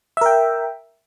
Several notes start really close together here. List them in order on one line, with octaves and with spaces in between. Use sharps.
E5 A#4 G5